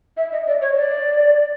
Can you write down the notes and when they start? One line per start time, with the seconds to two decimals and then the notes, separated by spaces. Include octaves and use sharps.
0.17 E5
0.32 D#5
0.47 D5
0.62 C#5
0.77 D5